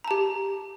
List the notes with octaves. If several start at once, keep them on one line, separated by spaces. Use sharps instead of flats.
G4 A5 A#5